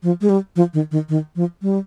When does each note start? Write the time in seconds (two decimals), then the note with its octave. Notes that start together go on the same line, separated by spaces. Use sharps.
0.03 F3
0.21 G#3
0.29 G3
0.56 F3
0.74 D#3
0.91 D#3
1.09 D#3
1.36 F3
1.62 G3